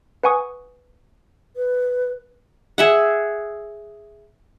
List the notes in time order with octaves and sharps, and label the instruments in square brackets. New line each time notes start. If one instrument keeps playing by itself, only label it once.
[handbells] B4 F#5 G#5 C#6 D#6
[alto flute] B4
[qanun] G#4 E5 F#5